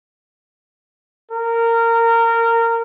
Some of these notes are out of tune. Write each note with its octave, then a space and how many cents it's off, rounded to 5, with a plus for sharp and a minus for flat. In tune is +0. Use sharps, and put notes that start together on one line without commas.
A#4 -20